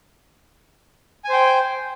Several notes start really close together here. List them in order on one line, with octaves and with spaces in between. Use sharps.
G#5 C5 G5